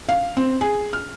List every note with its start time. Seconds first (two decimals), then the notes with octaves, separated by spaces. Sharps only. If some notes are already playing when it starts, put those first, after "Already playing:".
0.09 F5
0.37 C4
0.61 G#4
0.93 F6